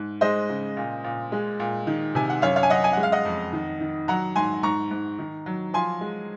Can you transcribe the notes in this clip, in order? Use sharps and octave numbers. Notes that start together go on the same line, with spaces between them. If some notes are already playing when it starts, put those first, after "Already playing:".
Already playing: G#2
G#3 C5 D#5
C#3
A#2
A#2
G#3
A#2
D#3
C3 G#5
F#5
F#2 C#5 F5
C#5 F5
G#5
F#2 D#5 F#5
G#5
G#3 F#5
F5
D#5 F#5
F2
D#3
D#3
F#3 F#5 A#5
G#2 G#5 C6
G#2 A#5 C#6
G#2
D#3
F#3
F3 G#5 C6
G#3